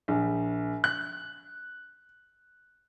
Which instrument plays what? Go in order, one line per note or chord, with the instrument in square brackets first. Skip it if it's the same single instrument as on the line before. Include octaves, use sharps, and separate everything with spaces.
[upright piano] A#1
F#6